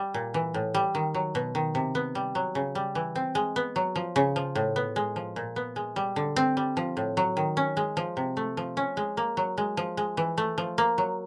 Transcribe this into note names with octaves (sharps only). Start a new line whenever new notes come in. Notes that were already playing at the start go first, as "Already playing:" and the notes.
Already playing: G3
A#2
E3
A2
G3
D#3
F#3
B2
D#3
C3
B3
G3
F#3
C#3
G3
E3
C4
G#3
B3
F#3
F3
C#3
F3
A2
B3
G#3
F3
A#2
B3
G#3
G3
D3
C4
G3
F3
A2
F#3
D#3
C#4
G#3
F3
C3
A3
F3
C#4
G#3
A#3
F#3
G#3
F3
G#3
E3
A3
F3
A#3
F#3